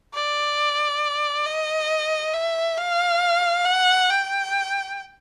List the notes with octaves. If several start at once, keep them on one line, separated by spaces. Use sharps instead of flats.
D5
D#5
E5
F5
F#5
G5